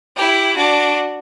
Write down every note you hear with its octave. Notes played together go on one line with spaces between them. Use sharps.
E4 G4
D4 F#4